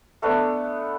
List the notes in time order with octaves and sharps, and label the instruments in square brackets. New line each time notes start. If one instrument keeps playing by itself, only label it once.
[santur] A3 B3 D4